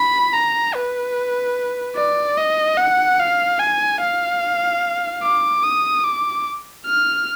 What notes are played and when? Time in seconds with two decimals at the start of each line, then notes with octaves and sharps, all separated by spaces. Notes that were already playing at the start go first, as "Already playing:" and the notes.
Already playing: B5
0.33 A#5
0.74 B4
1.96 D5
2.37 D#5
2.77 F#5
3.19 F5
3.59 G#5
4.01 F5
5.23 D6
5.63 D#6
6.04 D6
6.86 F6